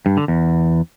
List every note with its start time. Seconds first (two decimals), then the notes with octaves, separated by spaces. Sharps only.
0.06 G2
0.17 D3
0.28 E2